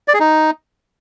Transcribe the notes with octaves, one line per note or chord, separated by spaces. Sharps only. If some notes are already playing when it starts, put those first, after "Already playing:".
D5
G#4
D#4